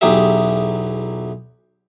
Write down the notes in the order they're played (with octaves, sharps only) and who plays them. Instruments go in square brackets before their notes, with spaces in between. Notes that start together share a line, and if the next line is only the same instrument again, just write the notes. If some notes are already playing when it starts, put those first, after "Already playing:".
[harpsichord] B1 E2 F#3 G4 G#4 E5